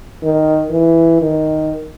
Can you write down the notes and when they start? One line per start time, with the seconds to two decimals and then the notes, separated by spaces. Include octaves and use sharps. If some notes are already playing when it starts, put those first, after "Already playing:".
0.23 D#3
0.70 E3
1.22 D#3